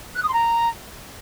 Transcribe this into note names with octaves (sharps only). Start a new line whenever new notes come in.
F#6
D#6
C6
A#5